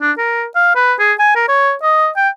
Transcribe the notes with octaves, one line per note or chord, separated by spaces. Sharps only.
D4
A#4
F5
B4
G#4
G#5
A#4
C#5
D#5
G5